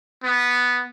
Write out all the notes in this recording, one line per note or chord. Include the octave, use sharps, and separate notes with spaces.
B3